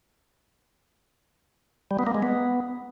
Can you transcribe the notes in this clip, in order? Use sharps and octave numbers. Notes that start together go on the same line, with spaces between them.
G3
B3
A#3
G#3
B3